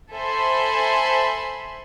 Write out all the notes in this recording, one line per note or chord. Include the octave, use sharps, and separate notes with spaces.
A4 C5 E5 G#5 B5 C6